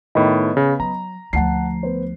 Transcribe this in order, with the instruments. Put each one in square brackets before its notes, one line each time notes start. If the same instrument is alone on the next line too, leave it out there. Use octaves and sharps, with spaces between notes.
[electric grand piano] A2 D#3 [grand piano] B3 D#5 B5
[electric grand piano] C#3
[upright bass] F#3 [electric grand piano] A#5
[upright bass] D2 F3 [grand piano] F#5 A5 C7
[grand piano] B3 C5